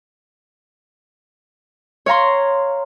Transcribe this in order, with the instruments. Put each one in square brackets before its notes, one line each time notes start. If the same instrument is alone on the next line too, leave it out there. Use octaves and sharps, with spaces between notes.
[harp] C#5 F5 A#5 C6